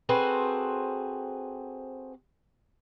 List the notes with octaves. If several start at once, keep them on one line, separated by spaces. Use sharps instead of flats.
C4 F#4 G#4 A4 B4 C5